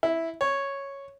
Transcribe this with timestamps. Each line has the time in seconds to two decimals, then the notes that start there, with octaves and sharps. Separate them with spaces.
0.03 E4
0.41 C#5